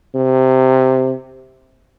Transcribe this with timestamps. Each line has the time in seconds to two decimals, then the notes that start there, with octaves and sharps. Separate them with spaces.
0.15 C3